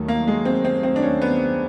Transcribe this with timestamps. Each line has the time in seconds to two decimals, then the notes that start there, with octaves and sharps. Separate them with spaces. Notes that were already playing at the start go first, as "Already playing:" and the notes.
Already playing: D#2 D#3 F#3 A3
0.08 A#3
0.28 G#3
0.45 C4
0.65 C4
0.83 C4
0.96 D4
1.02 C#4
1.22 B3